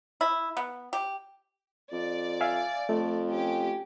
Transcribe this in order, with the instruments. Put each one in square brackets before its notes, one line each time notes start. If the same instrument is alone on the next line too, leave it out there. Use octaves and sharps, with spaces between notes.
[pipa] E4
B3
G4
[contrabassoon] F2 [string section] D5
[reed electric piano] E5 F5 G#5
[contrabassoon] F2 [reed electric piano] A3
[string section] C#4 G4